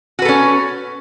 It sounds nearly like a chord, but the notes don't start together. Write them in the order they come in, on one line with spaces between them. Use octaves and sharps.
F#4 B4 A4 C#4